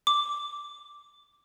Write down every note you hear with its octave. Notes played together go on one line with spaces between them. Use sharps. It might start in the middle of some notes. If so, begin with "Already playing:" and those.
D6